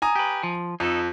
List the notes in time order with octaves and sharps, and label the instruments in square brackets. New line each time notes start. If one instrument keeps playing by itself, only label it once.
[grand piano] G#5 A#5 D#6
[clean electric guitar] G4 B4
F3
[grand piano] F2 [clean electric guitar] D#4 A4